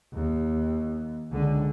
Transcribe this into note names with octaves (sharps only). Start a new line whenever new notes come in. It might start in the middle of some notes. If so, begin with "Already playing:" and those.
D#2
C#2 D3